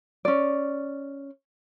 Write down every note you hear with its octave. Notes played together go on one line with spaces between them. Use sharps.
C#4 D5